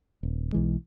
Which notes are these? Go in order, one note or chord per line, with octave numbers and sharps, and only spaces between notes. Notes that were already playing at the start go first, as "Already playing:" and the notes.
D#1
B1 E3 G#3